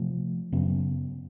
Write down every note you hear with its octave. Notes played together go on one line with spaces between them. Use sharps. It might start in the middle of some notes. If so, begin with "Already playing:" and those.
Already playing: C3 F3 A3
F#2 C#3 F#3 B3